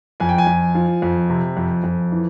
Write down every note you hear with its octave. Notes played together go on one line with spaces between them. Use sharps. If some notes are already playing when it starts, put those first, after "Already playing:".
F2 G#5
G5
G#5
F2
F3
F2
C3
F2
F2
E3